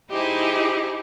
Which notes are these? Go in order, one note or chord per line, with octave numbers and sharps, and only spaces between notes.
D#4 E4 G4 G#4 C5